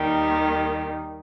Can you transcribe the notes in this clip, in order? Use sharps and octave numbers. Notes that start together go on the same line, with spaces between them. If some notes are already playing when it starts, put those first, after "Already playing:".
Already playing: D#2 D#3 G3